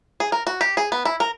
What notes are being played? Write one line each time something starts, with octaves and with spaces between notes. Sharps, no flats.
G#4
A#4
F#4
G4
G#4
B3
E4
A#4